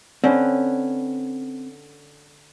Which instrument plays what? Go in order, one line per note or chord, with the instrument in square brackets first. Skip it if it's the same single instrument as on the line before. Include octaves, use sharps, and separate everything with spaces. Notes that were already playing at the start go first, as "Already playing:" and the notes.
[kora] D3 C#4 B4 [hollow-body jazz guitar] C4